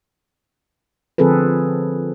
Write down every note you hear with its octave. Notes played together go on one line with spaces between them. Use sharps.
D3 F3 C4 G#4 A4 B4